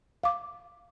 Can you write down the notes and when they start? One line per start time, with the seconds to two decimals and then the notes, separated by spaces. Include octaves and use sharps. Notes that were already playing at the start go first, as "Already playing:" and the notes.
0.23 F5 D6